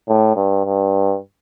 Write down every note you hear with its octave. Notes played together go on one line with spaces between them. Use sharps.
A2
G2
G2